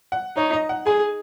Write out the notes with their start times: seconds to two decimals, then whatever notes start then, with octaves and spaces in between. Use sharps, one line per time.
0.12 F#5
0.37 D#4 C#5
0.53 D#5
0.69 F#5
0.86 G#4 G#5